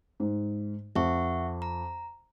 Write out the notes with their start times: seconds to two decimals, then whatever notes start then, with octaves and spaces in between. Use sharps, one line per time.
0.20 G#2
0.95 F2 E5 F#5 C#6
1.62 A#5